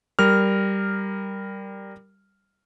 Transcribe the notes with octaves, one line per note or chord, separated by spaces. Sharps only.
G3 A#4 F6